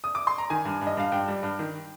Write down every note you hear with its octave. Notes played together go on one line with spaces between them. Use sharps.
D#6
D6
C6
A#5
D#3 G#5
G2
G2
D#5
G2 F5
G2 G5
G3
G2
D#3